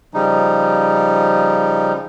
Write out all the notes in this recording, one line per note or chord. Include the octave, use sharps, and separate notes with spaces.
C#3 F3 G3 D#4